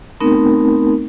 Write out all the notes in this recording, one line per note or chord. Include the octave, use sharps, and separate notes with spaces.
A3 B3 C4 D#4 A#4